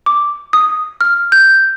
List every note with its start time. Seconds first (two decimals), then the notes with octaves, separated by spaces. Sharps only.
0.06 D6
0.53 D#6
1.01 F6
1.32 G6